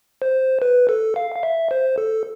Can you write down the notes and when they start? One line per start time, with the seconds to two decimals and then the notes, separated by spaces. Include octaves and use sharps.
0.22 C5
0.62 B4
0.89 A4
1.16 F5
1.35 F5
1.43 E5
1.71 C5
1.98 A4